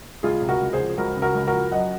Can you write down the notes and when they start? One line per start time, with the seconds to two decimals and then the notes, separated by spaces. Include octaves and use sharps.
0.23 C#2 F4 G#4
0.42 C3
0.49 F#4 A#4
0.61 C#2
0.73 G#4 C5
0.80 F3
0.98 C#2 F#4 A#4
1.17 C#3
1.22 F#4 A#4
1.35 C#2
1.47 F#4 A#4
1.53 F3
1.71 F#2 D#5 F#5